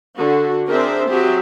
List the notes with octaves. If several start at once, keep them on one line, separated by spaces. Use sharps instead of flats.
D3 F#4
C4 D4 G#4 A#4 C5 E5
F#3 C4 G4 G#4 E5